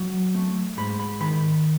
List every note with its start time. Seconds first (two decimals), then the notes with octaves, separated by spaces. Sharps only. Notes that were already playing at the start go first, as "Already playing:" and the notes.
Already playing: F#3
0.35 A3
0.77 G#2 B5
0.99 B5
1.20 D#3 B5